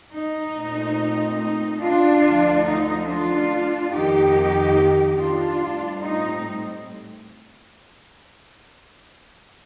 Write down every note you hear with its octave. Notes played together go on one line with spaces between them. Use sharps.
D#4
A#2 A3 C4
D#4
D4 F4
D2 D3 F3
D#4
D4 F4
F2 D#3 A#3 D#4 G4
D4 F4
A2 G3 C4
D#4